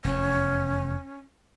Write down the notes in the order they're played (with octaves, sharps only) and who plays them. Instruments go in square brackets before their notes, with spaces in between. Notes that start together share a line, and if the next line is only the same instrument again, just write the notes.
[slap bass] F1 E2 [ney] C#4